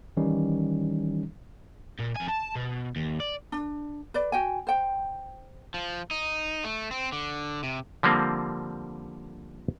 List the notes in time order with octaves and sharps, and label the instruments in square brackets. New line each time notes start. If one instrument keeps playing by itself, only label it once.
[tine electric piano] D#3 E3 G3 C#4 D#4
[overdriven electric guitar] A#2
F2 G#5
A5
B2
D#2
D5
[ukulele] D4
B4 D5
F#4 G5 G#5
C5 G5
[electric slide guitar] F3
D#4
A3
C4
D3
C3
[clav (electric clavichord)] D3 F3 G3 A#3 C4